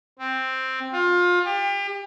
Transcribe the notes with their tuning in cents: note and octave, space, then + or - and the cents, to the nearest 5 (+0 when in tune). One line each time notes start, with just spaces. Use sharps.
C4 +0
F4 +25
G4 +35